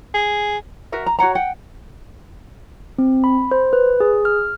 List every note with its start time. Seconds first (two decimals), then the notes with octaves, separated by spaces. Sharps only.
0.15 G#4
0.92 F#4 A#4 E5
1.06 A#5
1.19 F#4 C#5 F#5 A#5
1.35 F#5 G5
2.99 C4
3.24 B5
3.51 C5
3.73 B4
4.00 G#4
4.25 F6